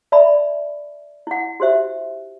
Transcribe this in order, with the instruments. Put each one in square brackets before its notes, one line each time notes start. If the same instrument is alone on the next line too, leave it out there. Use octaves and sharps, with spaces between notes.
[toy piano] D5 E5 A5 B5
E4 F#5
F#4 G4 C5 E5